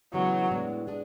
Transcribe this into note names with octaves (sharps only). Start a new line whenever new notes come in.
C#3 E3 F#3 G#3 B3
A2 G#3 B3 D4
G#3 D4 G#4